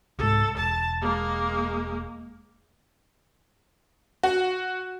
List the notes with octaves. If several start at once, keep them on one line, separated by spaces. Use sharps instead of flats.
C2 G#2 A4
E1 A5
G#3 A#3
F#4